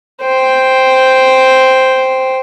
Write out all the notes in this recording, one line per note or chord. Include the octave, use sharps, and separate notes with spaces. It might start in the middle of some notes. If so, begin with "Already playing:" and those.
C5 G5